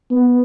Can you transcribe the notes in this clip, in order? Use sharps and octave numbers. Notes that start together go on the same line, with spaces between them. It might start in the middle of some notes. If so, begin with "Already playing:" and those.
B3